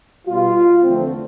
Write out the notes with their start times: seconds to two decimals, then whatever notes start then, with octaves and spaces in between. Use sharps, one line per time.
0.27 B2 G3 F4
0.84 E2 D3 F3 A3 C4